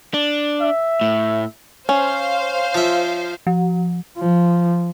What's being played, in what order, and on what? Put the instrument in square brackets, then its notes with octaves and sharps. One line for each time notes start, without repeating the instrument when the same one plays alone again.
[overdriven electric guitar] D4
[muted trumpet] E5
[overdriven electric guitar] A2
[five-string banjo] C#4 [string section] C5 F5
[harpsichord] F3 E5
[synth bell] F3
[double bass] F3